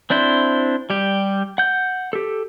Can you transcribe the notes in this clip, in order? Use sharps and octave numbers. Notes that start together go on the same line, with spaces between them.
C4 D4 E4 C5
G3 G4
F#5 G6
G4 A4